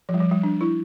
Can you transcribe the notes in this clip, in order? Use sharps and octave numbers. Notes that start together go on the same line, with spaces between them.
F3
G3
F3
G3
D4
E4